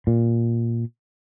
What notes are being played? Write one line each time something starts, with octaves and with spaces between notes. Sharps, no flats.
A#2